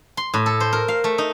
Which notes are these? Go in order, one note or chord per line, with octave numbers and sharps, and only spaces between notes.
C6
A2
A4
C5
A#4
F5
A3
D#4